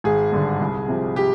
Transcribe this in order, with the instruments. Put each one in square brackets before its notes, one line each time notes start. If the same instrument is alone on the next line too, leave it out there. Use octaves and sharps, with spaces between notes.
[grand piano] G#1 [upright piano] G#4
[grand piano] G2 D3
C2
C3 F3
[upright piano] G4